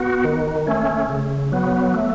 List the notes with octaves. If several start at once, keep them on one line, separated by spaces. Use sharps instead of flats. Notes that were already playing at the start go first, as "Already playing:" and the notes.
Already playing: B3 F#4
D#3
A3 C#4
C#3
F#3 B3
A3